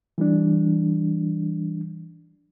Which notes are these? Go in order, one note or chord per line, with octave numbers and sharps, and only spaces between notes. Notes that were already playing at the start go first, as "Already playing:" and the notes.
E3 G3 D4